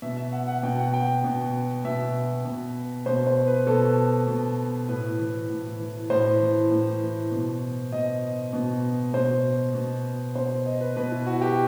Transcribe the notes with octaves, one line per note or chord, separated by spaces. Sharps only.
B2 E5
E5
F#5
F#5
B2 G5
F#5
G5
B2
B2 E5
B2
B2 C5
C5
B4
B2 A4
B2
A2 B4
E3
A2
E3
A2 C5
E3
A2
E3
B2
B2 D#5
B2
B2 C5
B2
B2 C5
D#5
B4
B2 B4
E4
F#4
G4